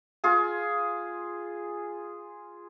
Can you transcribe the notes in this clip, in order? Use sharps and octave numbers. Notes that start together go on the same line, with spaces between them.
F4 G#4